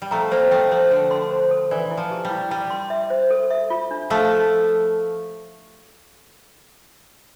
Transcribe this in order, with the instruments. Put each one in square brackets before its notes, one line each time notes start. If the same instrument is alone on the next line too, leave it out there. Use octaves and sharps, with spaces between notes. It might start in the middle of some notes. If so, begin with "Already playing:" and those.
[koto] G3
[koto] F3 A3 [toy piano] A#5
[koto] G3 A#3 [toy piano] C5
[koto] F3 A3 [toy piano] G5
[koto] F3 [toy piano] C5
[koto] D3 [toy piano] G5
[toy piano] C6
C5
A4
[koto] E3 [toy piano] D5
[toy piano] E4
[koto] F3
[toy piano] G4
[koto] G3
[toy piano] E4
[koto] G3 [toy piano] A5
[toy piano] C6
E5
C5
A4
E5
F4
D4
[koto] F3 A3 [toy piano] F5